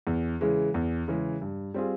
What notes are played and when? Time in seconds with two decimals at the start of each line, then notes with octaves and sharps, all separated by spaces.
0.07 E2
0.41 C#3 E3 G#3
0.74 E2
1.08 C#3 E3 G#3
1.42 G2
1.74 G3 C4 F4 G#4